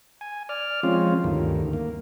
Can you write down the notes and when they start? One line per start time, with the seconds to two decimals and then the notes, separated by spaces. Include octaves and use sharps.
0.21 G#5
0.49 D5 F6
0.83 F3 G#3 C4 C#4 F4
1.24 D2 G2 D#3
1.73 A#3